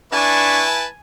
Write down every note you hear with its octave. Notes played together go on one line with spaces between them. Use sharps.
D4 E4 B4 G#5 A5 C#6